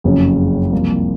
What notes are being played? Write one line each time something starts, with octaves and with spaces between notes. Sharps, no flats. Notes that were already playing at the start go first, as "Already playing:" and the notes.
F#1 F2 C#3 F#3 C#4
C2 C3 F3 A#3